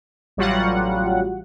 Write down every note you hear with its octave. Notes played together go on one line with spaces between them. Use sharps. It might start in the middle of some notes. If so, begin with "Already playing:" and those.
A1 F#3 G3 F4 F#4 F#5